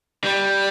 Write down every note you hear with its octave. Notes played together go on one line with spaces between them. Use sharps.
G3